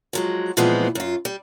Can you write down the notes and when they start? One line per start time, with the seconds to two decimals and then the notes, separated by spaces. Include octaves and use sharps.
0.13 F3 F#3 G#3
0.57 A#2 E3 F3 G#3 B3 C4
0.95 F#2 F4
1.25 G3